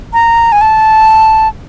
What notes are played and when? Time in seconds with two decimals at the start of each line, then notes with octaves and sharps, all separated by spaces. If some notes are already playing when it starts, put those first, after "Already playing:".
0.13 A#5
0.52 G#5
0.61 A5